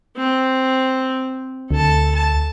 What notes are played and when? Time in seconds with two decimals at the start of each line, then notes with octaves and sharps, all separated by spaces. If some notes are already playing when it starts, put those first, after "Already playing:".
0.16 C4
1.71 D2 A4 A5
2.15 A5